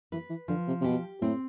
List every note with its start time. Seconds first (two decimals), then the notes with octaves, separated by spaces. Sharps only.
0.12 E3 B4
0.29 E3
0.48 D3 F3
0.67 C3
0.81 C3
0.84 B2 G4
1.21 A2 C4